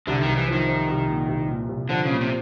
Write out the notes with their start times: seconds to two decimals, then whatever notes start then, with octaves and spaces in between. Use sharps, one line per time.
0.07 C2 D3
0.22 D#3
0.27 C2
0.37 E3
0.48 D#3 F3
0.68 F3
0.88 C2
1.08 A#2
1.29 C2
1.49 A#2
1.69 C2
1.89 D3 F3
2.05 A#2 C#3
2.21 C3